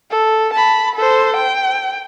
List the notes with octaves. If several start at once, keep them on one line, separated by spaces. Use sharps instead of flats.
A4
A5 B5
A4 C5
G5